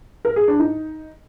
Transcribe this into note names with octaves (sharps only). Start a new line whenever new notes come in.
A#4
G#4
D4
D#4